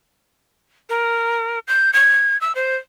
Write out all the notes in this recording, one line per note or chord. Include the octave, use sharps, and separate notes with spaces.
A#4
G6
G#6
E6
C5